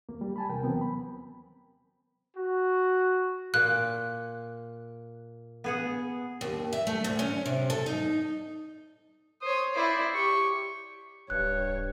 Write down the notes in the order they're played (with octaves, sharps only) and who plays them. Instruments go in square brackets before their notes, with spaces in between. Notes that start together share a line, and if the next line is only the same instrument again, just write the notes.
[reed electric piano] D#2 A#3
G3
G#5 A5 B5
D#2 C3 E3 A#4 G5
F#3 B3 C4
B5
[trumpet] F#4
[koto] A#2 [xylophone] F#6
[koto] B3 G#4 F#5
[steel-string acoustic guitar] D#2
E5
A3
D2
C#4
C3
A4
D#4
[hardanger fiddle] C5 C#5 [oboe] D#6
[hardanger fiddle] E4 D5 [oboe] C5
[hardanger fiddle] G4 [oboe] C#6
[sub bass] D1 [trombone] G2 [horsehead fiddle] C#5 [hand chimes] F#6